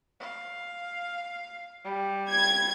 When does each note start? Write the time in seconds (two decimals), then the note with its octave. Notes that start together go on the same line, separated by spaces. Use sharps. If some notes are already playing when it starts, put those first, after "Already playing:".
0.20 F5
1.85 G3
2.32 G#6